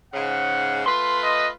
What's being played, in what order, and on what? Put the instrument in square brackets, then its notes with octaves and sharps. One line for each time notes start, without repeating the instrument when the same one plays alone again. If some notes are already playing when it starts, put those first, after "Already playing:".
[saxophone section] G#2 C#3 [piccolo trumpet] F#5
[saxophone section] A3 F4 B4 [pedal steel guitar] C6
[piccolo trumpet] D#5